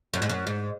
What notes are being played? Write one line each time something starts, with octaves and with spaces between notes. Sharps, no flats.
F#2
G#2
F#2
G#2